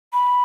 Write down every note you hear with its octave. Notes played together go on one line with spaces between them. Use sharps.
B5